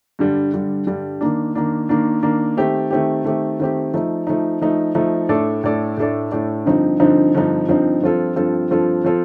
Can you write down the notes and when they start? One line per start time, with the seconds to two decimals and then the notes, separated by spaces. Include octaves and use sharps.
0.19 G2 D3 G3
0.53 G2 D3 G3
0.87 G2 D3 G3
1.21 D#3 A#3 D4
1.55 D#3 A#3 D4
1.89 D#3 A#3 D4
2.23 D#3 A#3 D4
2.57 D#3 A3 C4 G4
2.91 D#3 A3 C4 G4
3.25 D#3 A3 C4 G4
3.60 D#3 A3 C4 G4
3.94 F3 A3 D#4
4.27 F3 A3 D#4
4.61 F3 A3 D#4
4.95 F3 A3 D#4
5.29 A2 A3 D4 A4 D5
5.64 A2 A3 D4 A4 D5
5.97 A2 A3 D4 A4 D5
6.32 A2 A3 D4 A4 D5
6.66 G2 D3 F3 C4 D#4
7.00 G2 D3 F3 C4 D#4
7.35 G2 D3 F3 C4 D#4
7.68 G2 D3 F3 C4 D#4
8.02 G2 F3 C4 F4 A4
8.36 G2 F3 C4 F4 A4
8.71 G2 F3 C4 F4 A4
9.04 F3 C4 F4 A4